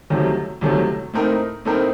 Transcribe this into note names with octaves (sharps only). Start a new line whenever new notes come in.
C2 C3 D#3 F#3 A3
C2 C3 D#3 F#3 A3
A2 A3 C4 D#4 A#4
A2 A3 C4 D#4 A#4